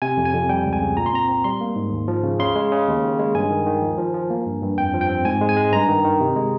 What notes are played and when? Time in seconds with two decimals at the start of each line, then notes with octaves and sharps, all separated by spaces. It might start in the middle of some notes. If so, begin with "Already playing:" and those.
0.02 C3 G#5
0.17 F2
0.25 G#5
0.34 F2
0.49 G3 G5
0.65 C#2
0.73 G#5
0.81 C#3
0.97 A#2 A#5
1.06 C6
1.13 C4 A#5
1.29 C4
1.44 G3 C6
1.61 A#3
1.76 G#2
1.92 D#2
2.08 F3
2.24 C#3
2.39 C#3 C6
2.55 G#3
2.71 C#3
2.87 D#2
3.03 D#2
3.19 G#3
3.35 G2 G#5
3.50 D#3
3.66 D#3
3.82 F3
3.98 F3
4.14 F3
4.30 A#3
4.46 G2
4.62 G2
4.78 F2 G5
4.94 F3
5.01 G5
5.09 C4
5.25 G#2 G#5
5.41 G#3
5.49 G#5
5.57 G#3
5.73 G2 A#5
5.88 D#3
6.04 D#3
6.20 C3
6.36 G#3